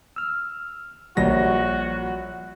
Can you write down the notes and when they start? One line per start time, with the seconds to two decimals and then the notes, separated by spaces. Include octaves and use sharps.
0.16 E6 F6
1.17 A#1 G3 F#4 C#5 A#6